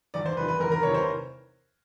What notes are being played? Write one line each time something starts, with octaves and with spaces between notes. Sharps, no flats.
E2 D5
C5
C3 E3 B4
B4
E2 A#4
A#4
C3 E3 C#5
C5